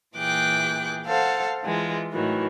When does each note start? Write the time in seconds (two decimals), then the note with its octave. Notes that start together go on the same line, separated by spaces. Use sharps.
0.15 A#2 E3 G#4 G5 D6 F#6
1.06 A4 C5 F5 F#5
1.63 E3 G#3 F4
2.11 A2 D#3 E3 F#3